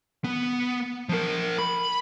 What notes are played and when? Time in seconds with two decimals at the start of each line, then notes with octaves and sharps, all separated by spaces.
0.24 B3
1.09 F3 A#4
1.59 B5